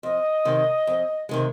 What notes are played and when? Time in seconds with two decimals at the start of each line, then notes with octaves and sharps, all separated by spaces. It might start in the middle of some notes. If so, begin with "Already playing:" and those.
0.03 F2 D#5
0.45 C3 D#3 G#3
0.87 F2
1.29 C3 D#3 G#3